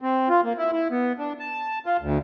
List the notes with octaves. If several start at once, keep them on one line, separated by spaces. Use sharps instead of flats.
C4
F4
A#3
E4
E4
B3
D4
A5
F4
D2